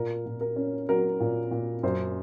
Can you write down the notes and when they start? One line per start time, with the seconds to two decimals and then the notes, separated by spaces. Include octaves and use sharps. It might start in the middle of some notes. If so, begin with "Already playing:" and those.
Already playing: A#2 A#4
0.26 A#2
0.41 A#4
0.56 C#4
0.89 F#3 A#4
1.20 A#2
1.51 A#2
1.83 F#2 C5